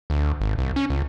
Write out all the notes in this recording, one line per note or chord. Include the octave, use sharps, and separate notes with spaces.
D2
G#1
C2
C#4
C#2